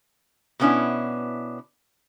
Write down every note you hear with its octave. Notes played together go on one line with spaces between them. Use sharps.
B2 A3 B3 C#4 D4 E4